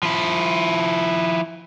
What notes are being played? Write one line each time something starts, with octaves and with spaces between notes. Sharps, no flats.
F3 E4